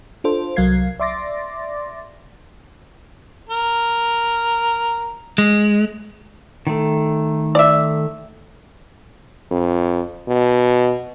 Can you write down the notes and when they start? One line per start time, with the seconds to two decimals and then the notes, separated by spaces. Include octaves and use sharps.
0.24 D4 F4 A4 C5
0.56 C2 F#3 A#4 F5 G#6 C7
1.00 D5 E5 C6 D6 A6 A#6
3.49 A#4
5.38 G#3
6.67 D#3 A3
7.55 D5 E5
9.51 F2
10.28 B2